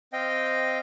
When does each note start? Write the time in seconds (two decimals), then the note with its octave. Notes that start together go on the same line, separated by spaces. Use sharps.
0.13 C4 D#5 F5 G5